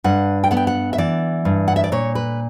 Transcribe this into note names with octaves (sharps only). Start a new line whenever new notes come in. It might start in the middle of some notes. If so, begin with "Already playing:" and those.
G2 F#5
G5
B3 F#5
G5
F#5
E5
E3 D5
G2
F#5
E5
D5
A#2 C#5
B4